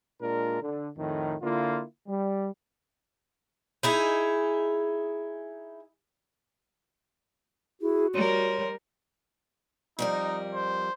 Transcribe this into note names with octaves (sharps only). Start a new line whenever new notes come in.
A#2 G#3 D4 F4 A#4
D3
F2 A2 D#3
D3 A#3 E4 F4
G3
D#4 E4 G#4
E4 F#4 G#4
G3 A#4 C#5 C6
F2 G3 D#4 A#4
C5